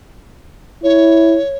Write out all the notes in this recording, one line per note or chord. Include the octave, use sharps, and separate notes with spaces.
E4 C#5